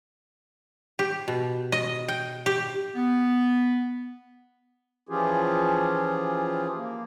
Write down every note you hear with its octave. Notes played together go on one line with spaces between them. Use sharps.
G4
B2
D#5
G5
G4
B3
E3 F3 C#4 F4 G4 G#4
A#3